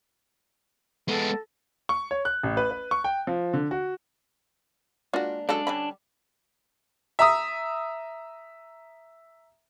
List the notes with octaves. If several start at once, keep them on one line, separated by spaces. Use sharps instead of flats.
G#3 B3 A4
C#6
C#5
F#6
A1
B4
B4
C#6
G5
F3
D3
F#4
G#3 A#3 D4 F4 F#4
C#3 F#3 G#3 D4 A4
D3 G3 C#4 B5
E5 A#5 D#6